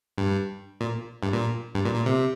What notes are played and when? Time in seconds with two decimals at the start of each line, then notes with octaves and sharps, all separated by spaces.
0.18 G2
0.81 A#2
1.23 G2
1.33 A#2
1.75 G2
1.85 A#2
1.95 A#2
2.06 C3